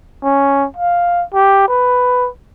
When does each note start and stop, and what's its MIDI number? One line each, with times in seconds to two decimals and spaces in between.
0.23 0.66 61
0.76 1.23 77
1.33 1.66 67
1.68 2.29 71